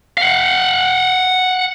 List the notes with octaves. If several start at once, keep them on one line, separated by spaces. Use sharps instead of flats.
F5 F#5